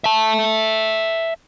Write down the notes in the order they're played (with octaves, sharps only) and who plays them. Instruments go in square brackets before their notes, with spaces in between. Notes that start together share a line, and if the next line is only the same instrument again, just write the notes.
[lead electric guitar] E5 A5